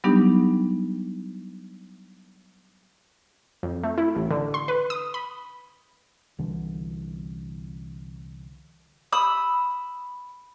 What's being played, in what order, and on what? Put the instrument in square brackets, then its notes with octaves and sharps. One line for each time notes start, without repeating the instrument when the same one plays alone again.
[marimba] F#3 G3 B3 D4 D#4 G4
[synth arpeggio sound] F2
A3
E4
A1
D3
C6
B4
D#6
B5
[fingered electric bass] C2 D3 E3
[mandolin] B5 D#6 E6